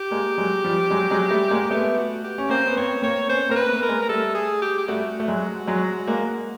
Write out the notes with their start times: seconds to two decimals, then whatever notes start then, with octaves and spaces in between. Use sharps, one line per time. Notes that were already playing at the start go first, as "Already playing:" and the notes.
Already playing: G4
0.11 G#3 A#3
0.38 F#3 G#3
0.64 F3 G3
0.91 F#3 G#3
1.11 F#3 G#3
1.31 G3 A3
1.50 G#3 A#3
1.71 A3 B3 G4
1.97 F#4
2.24 G4
2.38 C#4
2.49 A#3 C4 C5
2.67 B3
2.77 A#3 C4 C#5
3.02 A#3 C4 C#5
3.29 B3 C#4 C5
3.49 A#3 C4 A#4
3.56 B4
3.69 A3 B3
3.83 A#4
3.89 G#3 A#3
4.02 A#4
4.09 G3 A3 A4
4.35 G#4
4.62 G4
4.78 G4
4.88 G3 A3 F#4
5.20 A3
5.28 F#3 G#3
5.67 F#3 G#3
6.08 G#3 A#3